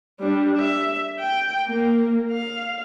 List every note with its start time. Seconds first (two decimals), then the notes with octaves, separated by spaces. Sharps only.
0.20 G3 D4
0.57 E5
1.19 G5
1.66 A#3
2.31 F5